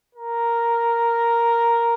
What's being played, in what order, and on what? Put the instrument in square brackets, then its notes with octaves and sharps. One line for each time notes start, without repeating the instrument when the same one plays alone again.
[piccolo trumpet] A#4